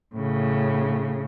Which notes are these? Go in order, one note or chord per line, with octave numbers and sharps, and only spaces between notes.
A2 C#3